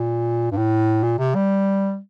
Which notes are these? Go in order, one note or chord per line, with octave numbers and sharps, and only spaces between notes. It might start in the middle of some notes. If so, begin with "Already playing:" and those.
Already playing: A#2
G2
A2
A#2
C3
G3